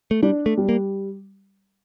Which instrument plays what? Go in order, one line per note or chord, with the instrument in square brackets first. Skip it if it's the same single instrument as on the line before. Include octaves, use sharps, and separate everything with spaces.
[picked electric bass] A3
[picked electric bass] G3 [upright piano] D4
[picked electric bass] A3
[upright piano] G3
[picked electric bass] A#3